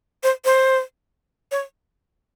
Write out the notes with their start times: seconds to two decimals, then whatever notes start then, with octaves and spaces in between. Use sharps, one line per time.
0.23 C5
0.45 C5
1.52 C#5